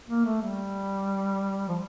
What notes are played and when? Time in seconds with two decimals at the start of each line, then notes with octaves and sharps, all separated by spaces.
0.09 A#3
0.25 A3
0.42 G3
1.69 F3